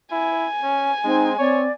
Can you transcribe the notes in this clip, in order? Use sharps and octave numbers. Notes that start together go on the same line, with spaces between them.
E4 G#5
C#4
G#3 C4 D#4
C4 C#5 D5